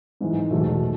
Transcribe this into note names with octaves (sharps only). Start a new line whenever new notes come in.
G#2 E3 G#3
E2 B2 F#3 A3
D#3